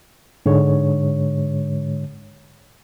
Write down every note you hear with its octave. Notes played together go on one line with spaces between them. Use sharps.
G#2 D3 G#3 C#5